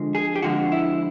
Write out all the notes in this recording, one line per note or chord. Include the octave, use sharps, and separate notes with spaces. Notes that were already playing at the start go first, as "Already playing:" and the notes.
Already playing: F2 D3 F3 G#3
G#4
G4
F2 D3 F3 G#3 F#4
E4